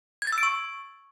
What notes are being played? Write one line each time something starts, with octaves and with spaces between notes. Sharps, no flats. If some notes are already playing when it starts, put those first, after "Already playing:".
G#6
A6
E6
D7
C#6